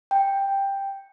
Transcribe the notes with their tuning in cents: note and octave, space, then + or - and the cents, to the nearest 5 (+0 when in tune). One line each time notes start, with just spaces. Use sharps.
G5 +5